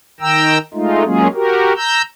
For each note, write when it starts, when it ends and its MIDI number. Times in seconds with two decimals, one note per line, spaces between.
0.20 0.58 51
0.20 0.58 79
0.20 0.58 82
0.20 0.58 88
0.74 1.04 56
0.74 1.04 57
0.74 1.04 63
0.74 1.04 65
1.05 1.27 54
1.05 1.27 56
1.05 1.27 58
1.05 1.27 61
1.05 1.27 65
1.05 1.27 68
1.34 1.73 66
1.34 1.73 67
1.34 1.73 70
1.77 2.02 82
1.77 2.02 88
1.77 2.02 91